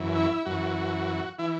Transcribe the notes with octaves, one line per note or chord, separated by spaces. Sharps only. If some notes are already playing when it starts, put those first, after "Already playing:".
Already playing: F#2 E3
E4
F#2 E3 F#4
E3 E4